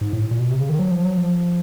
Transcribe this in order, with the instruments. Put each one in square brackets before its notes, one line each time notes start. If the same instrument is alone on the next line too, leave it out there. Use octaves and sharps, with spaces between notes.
[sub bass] G#2
A2
A#2
B2
C3
C#3
D#3
F#3
F3
F#3
F3